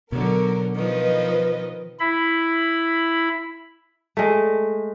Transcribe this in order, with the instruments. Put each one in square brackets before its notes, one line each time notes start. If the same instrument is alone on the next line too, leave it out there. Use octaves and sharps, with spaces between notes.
[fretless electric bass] B2 [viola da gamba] D3 F#3 [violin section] A#4
[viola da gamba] D#3 F3 [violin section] B4 D#5
[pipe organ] E4 B5
[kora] G#3 A3